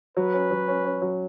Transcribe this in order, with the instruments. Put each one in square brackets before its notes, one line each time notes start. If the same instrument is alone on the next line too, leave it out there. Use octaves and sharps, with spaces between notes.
[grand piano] F#3 [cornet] B4
[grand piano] C#4
F#3
C#4
C#4
F#3